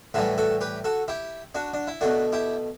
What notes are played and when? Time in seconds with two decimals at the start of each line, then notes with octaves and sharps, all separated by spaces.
0.14 A2 E3 G3 F#4 A4
0.38 F#4 A4
0.61 G4 B4
0.84 F#4 A4
1.08 E4 G4
1.55 D4 F#4
1.74 D4
1.87 E4
2.01 B2 A3 D4 F#4
2.32 E4 G4